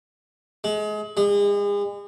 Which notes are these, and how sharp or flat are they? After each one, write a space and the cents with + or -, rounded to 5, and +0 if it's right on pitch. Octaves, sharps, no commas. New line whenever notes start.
G#3 +30
G#3 -40